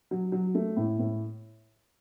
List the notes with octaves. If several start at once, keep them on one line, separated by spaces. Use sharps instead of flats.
F#3
F#3
A3
A2
A2